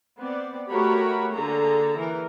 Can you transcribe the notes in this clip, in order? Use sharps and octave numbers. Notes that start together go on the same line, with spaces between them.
B3 C4 D5
A3 F#4 G4 A#4 C#5 B5
D3 A#3 G#4 A4 A#5
E3 A#4